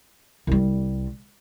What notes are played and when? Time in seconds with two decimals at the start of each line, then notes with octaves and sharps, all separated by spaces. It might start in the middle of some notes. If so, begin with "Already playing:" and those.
0.47 C2 G3